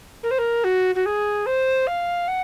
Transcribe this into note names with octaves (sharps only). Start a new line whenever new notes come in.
A#4
C5
A#4
F#4
F#4
G#4
C5
F5
F#5